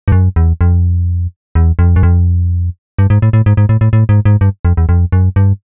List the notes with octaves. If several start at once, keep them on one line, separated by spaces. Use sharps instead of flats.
G2
F#2
E2
F2
E2
F2
F#2
F2
G2
G#2
A2
A2
G#2
G#2
A2
A2
A2
G#2
G#2
G2
F2
E2
F2
F#2
G2